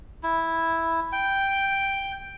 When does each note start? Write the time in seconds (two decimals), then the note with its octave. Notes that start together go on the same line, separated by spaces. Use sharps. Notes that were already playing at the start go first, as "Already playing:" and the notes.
0.23 E4
1.12 G5